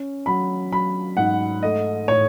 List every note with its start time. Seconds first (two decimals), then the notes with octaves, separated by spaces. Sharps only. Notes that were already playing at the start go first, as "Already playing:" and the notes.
Already playing: C#4
0.26 F#3 B5
0.72 F#3 B5
1.17 G#2 F#5
1.62 A3 D#5
2.08 A2 C#5